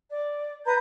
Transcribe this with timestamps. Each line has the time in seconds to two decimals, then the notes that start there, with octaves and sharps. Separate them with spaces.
0.10 D5
0.66 B4 A#5 G6